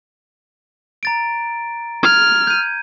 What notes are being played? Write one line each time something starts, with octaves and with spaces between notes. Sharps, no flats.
A#5 A6 D7
F6 G#6
G6 D#7